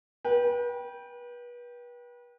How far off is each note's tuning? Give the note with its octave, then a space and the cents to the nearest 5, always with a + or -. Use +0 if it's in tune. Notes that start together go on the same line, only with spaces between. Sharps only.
B4 -35 G5 +0